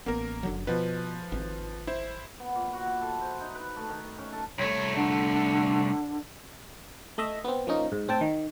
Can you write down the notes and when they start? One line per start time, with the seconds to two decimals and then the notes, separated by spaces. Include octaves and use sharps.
0.06 A1 A#3 B3 A#4
0.43 F#1 D3 F#3
0.67 B2 F3 B4
1.32 G#1
1.87 E4 C5
2.40 B3
2.55 A#2
2.73 F#4
2.86 E4
3.01 A4
3.21 C5
3.40 D#4
3.55 B4
3.76 A3
3.89 D#3
4.18 C#4
4.33 A4
4.58 C2 A3 C#5
4.96 D3
7.18 A3 D#5 E5
7.44 B3 C4
7.67 F3 A#3 C#4 D#4
7.92 G#2
8.08 A2 C4 A4 G5 A5
8.21 D#3